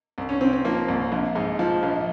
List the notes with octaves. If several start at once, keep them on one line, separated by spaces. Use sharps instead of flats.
C2
C#4
C3 C4
C4
F3 A#3
C2
A#1
G#2
F3
A#1